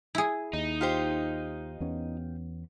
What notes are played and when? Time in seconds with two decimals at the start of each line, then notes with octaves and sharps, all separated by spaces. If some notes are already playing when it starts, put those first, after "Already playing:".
0.15 E4 G#4
0.53 D#2 D#4
0.81 F4 G4 C5
1.80 E2 B3 C#4